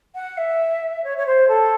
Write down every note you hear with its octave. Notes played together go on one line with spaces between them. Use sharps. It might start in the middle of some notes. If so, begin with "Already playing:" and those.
F#5
E5
C#5
C#5
C5
A4